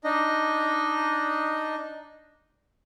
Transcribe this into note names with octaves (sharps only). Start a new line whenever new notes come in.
D4 D#4 D#5